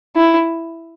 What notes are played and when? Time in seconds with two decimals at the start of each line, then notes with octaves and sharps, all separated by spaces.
0.16 E4